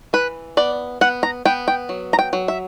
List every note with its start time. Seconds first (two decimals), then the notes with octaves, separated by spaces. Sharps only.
0.13 E3 B4
0.57 B3 D5
1.01 B3 F#5
1.23 A#5
1.45 B3 G5
1.68 G5
1.89 F#3
2.13 A#5
2.19 G5
2.33 F#3
2.48 E5